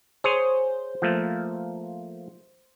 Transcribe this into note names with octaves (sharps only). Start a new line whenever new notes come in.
G#4 C5 C#5
F3 A3 A#3